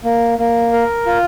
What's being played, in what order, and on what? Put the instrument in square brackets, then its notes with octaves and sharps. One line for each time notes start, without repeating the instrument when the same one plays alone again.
[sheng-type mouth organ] A#3
A#3
A#4
F4